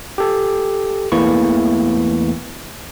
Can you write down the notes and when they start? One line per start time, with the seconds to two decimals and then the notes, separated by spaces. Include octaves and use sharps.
0.18 G4 A4
1.12 E2 E3 A3 A#3 E4 C#6